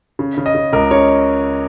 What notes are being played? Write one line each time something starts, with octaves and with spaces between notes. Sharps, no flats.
C#3
C#3
D#5
C#3
C#2 A#4
C#3 C#5